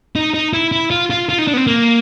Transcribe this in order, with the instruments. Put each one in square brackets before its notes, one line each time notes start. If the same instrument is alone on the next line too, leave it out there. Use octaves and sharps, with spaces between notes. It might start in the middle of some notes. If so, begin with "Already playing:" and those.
[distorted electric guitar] D#4
D#4
E4
E4
F4
F4
F4
D#4
D4
B3
C4
A#3